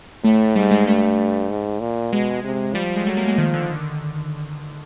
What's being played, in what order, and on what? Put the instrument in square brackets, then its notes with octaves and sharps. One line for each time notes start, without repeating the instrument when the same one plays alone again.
[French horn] A2 [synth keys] A3
[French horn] G#2 [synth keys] G3
[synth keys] G#3
[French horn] G2 [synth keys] A3
[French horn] G#2
A#2
[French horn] B2 [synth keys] G#3
[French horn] C3
[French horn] F3 [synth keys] G3
[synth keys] G3
G#3
[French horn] F#3 [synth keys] A3
[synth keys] A#3
G#3
[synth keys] D#3 [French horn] F3
[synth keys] D3